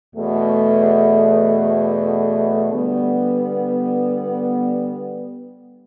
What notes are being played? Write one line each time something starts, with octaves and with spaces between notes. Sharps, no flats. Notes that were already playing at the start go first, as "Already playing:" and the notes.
E2 B2 A3
D3 G3 B3